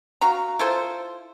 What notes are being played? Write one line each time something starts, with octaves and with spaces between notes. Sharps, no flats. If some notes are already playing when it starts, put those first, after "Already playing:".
F#4 F5 A#5
E4 F4 A4 C5